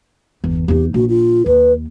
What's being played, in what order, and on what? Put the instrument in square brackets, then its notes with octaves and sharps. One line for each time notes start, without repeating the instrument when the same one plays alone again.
[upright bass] G1 E2
[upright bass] E2 D#4 [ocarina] G4
[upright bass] A#1 [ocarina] F#4
[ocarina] F4
[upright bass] D#2 [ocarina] B4